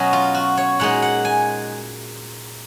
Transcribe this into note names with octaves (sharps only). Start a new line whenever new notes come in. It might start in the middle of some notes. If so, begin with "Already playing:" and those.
Already playing: B2 F#3 C#4 D#5
F4
F#4
C#5
A#2 G#3 D#4 F#5
F#5
G#5